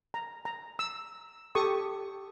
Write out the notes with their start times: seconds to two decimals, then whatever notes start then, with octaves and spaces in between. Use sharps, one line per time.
0.14 A#5
0.45 A#5
0.79 E6
1.55 G4 A4 C#6 D#6